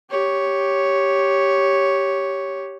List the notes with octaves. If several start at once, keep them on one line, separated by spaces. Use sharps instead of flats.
G4 C#5